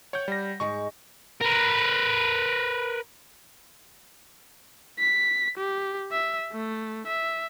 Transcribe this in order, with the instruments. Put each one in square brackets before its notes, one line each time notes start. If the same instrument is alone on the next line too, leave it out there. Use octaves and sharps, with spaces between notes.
[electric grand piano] C#5 G6 [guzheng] F#5 G5
[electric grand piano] G3 A#6
[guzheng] G#2 G#3 D#4 [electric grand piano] C#6
[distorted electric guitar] A#4 B4
[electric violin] B6
G4
E5
A3
E5